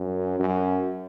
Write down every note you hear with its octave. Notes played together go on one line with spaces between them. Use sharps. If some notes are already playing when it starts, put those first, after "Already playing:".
Already playing: F#2
F#2